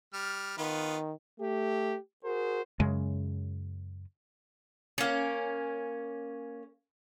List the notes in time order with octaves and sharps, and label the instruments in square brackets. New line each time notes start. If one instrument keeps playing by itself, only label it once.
[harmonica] G3 F6
[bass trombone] D#3 [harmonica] B3 F4 B4
[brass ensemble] A3 G4
F#4 G#4 A#4 C5
[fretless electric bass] F#2 C#3 G#3
[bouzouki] A#3 C#4